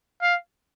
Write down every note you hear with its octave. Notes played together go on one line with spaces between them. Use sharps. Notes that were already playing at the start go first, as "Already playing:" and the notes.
F5